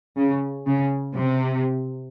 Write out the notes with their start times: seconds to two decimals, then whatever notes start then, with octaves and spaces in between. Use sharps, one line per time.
0.18 C#3
0.66 C#3
1.15 C3